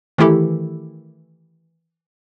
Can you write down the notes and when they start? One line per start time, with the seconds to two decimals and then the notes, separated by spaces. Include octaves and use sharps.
0.18 D#3 E3 A3 E4 G4 A4